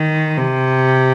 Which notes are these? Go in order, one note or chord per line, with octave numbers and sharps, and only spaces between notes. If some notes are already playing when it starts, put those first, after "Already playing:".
Already playing: D#3
C3